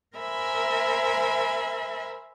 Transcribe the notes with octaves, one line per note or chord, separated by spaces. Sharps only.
A#4 C5 E5 G#5 B5